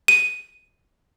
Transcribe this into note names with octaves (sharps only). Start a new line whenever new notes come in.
D#7